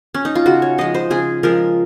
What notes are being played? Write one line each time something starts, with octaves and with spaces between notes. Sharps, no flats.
C#4
D#4
F4
C#3 F#4
C#5
F3 G#3 D#5
C5
C#3 G#4
F3 G#3 A#4